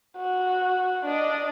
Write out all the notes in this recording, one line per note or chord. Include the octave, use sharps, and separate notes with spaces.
F#4
D4 D#5